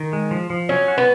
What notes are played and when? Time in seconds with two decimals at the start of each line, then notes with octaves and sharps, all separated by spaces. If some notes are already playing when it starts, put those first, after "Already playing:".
Already playing: D#3
0.13 G#3
0.31 F3
0.50 F3
0.69 F#3 C#4
0.88 F#4
0.98 B3